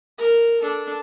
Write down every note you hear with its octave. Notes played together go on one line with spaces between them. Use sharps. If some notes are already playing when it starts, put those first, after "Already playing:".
A#4
D4 A4